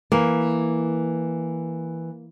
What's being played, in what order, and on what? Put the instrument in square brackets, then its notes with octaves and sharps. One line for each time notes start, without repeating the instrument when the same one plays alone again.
[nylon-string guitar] E3 [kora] A#3